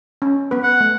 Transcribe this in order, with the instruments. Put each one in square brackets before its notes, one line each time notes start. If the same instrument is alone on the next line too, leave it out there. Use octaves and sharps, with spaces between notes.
[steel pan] C#4
B3 B4
[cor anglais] F#5
[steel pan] A3